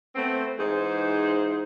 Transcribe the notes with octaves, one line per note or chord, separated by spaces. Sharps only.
A3 B3 C4
G#2 E3 D#4 G#4 C5